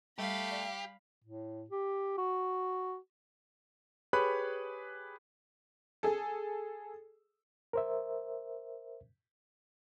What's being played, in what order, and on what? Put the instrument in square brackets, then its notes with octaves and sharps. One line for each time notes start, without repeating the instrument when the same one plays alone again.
[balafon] G3 [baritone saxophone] A3 [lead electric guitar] G4 [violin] F5 B5
[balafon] D5
[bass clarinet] A2
G4
F#4
[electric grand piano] G4 G#4 B4 C#5 B5 F#6
[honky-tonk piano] G#4 A4
[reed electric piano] A#4 C5 E5